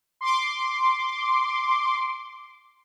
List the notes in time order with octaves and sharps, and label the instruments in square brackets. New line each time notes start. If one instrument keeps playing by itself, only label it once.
[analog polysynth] C6 D6